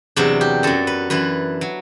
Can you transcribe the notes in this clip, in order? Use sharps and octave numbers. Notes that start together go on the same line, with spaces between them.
E2 C3 F#3 D4
G4
F#2 F#3 A4
B4
F#2 E3 B4
F#3